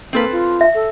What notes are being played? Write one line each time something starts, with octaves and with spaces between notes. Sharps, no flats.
A#3 C4 A4 B4
F4
E5
A4